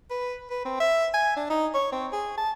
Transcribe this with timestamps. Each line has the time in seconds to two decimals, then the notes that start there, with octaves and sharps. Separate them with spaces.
0.10 B4
0.50 B4
0.65 C4
0.80 E5
1.14 G#5
1.36 D4
1.50 D#4
1.74 C#5
1.92 C4
2.12 G#4
2.37 A5